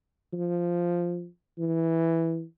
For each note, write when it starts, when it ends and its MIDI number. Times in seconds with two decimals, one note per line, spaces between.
0.33 1.27 53
1.58 2.43 52